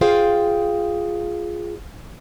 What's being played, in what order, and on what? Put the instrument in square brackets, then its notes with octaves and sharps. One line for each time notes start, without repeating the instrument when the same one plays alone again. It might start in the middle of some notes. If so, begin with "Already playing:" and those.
[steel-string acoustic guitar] F4 G#4 C5 F5 G5